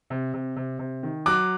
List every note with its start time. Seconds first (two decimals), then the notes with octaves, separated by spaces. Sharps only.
0.10 C3
0.34 C3
0.56 C3
0.79 C3
1.03 D#3
1.26 F#3 D6 F#6